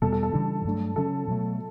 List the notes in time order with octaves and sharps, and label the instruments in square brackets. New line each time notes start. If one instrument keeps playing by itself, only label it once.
[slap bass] E2 B2 G3 [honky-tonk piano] A4
[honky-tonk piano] A4
A4
[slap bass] C#3 E3 G3 D4
G2 F#3 A3 D4
[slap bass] C#3 F#3 C#4 [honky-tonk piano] A4
[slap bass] B2 F#3 A3